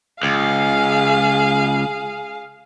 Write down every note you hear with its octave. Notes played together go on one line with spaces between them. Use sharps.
C#2 G#4 F5